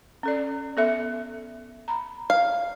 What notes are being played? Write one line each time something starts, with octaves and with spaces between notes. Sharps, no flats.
C#4 A4 D5
B3 A4 E5
A#5 B5
F5